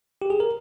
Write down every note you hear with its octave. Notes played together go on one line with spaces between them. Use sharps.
G4
G#4
A#4